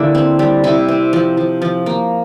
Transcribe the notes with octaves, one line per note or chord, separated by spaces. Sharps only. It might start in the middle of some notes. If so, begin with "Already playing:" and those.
Already playing: D3 A#3 D4 E4 G4
C4
G3
C3 E4
C4
F3
F3
F3
A#3